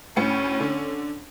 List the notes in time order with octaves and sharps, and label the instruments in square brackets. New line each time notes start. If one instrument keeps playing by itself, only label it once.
[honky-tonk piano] D2 A2 C#7 [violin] C#4
[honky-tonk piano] D3